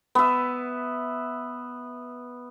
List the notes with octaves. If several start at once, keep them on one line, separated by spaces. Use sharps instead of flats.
B3 E5